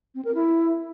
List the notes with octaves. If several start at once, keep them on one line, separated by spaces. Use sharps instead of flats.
C4
A#4
E4